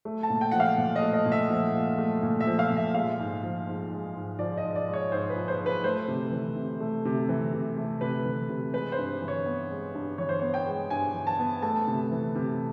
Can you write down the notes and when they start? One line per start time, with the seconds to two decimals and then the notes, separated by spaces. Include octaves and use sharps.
0.05 A3
0.23 A5
0.30 A#2
0.41 G5
0.51 F3 F#5
0.60 F5
0.78 A#2
0.96 D#5
1.02 A3
1.13 D#5
1.26 A#2
1.32 E5
1.50 F3
1.74 A#2
1.98 A3
2.23 A#2
2.41 E5
2.47 F3
2.59 F5
2.71 A#2
2.77 E5
2.95 G#3 F5
3.19 G#2
3.43 F3
3.67 G#2
3.91 G#3
4.15 G#2
4.39 F3 D5
4.57 D#5
4.63 G#2
4.75 D5
4.88 G#3
4.94 C#5
5.12 G#2 C5
5.30 B4
5.36 F3
5.48 C5
5.61 G#2
5.66 B4
5.84 A3 C5
6.08 C3
6.32 E3
6.56 C3
6.80 A3
7.05 C3
7.29 E3
7.53 C3
7.77 A3
8.01 C3 B4
8.25 E3
8.49 C3
8.73 G#3 B4
8.92 C5
8.98 G2
9.22 E3
9.28 C#5
9.46 B3
9.70 G#3
9.94 G2
10.18 E3 C#5
10.29 C5
10.40 B3 C#5
10.54 G5
10.67 G#3
10.90 G2 G#5
11.14 E3
11.27 A5
11.39 B3
11.62 A3 A5
11.87 C3
12.11 E3
12.35 C3